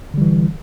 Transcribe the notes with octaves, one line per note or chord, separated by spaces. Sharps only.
D3 E3 G3